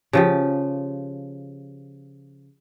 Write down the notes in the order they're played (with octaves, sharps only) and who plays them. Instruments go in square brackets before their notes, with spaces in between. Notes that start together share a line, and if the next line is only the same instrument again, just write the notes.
[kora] C#3 F3 G4